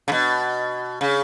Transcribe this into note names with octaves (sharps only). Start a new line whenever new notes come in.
C#3
B2
C#3